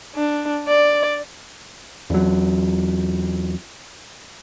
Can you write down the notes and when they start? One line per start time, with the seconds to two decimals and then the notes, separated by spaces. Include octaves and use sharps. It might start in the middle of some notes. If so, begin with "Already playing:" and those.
0.15 D4
0.67 D5
2.10 E2 F#3